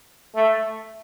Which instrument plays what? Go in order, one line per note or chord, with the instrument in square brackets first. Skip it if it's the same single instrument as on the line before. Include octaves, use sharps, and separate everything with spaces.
[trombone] A3